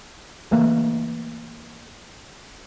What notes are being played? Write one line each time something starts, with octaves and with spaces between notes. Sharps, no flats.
C#3 E3 A3 A#3